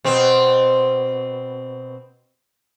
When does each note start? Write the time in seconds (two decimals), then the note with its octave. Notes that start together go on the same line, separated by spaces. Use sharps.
0.04 B2 C4